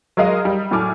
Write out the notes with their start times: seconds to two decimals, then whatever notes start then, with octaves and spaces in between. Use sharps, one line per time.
0.17 F#3 G#3 A#4 D#5 F5
0.45 G3
0.71 A2 F#3 A4 G#5 D6 F6